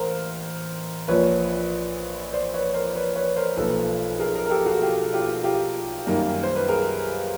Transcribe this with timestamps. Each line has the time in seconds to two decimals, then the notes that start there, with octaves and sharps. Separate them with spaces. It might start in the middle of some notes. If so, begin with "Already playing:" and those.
Already playing: A1 A#3 A#4 C5
1.08 A#1 A#2 F3 B4 C#5
2.33 C5 D5
2.54 B4 C#5
2.74 A#4 C5
2.95 B4 C#5
3.16 B4 C#5
3.36 A#4 C5
3.57 B1 A#2 F3 A#3 A4 B4
4.19 G#4 A#4
4.35 G#4 A#4
4.46 A#4
4.50 G4 A4
4.66 F#4 G#4
4.82 F4 G4
5.13 F4 G4
5.44 F4 G4
6.06 F#2 D#3 G3 A#3
6.43 C5
6.56 B4
6.68 G#4 A#4